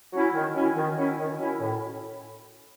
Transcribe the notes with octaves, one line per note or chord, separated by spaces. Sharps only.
F#3 C#4 E4
D#3
F#3 C#4 E4
D#3
F#3 C#4 E4
D#3
F#3 C#4 E4
A2